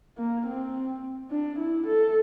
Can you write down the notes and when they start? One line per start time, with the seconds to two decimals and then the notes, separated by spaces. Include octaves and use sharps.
0.17 A#3
0.46 C4
1.31 D4
1.59 E4
1.87 A4